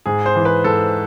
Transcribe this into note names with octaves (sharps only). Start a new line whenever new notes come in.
G#2 G#4
C5
E3
B4
G#2 A4